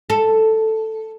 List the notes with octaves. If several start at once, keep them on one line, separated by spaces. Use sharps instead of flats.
A4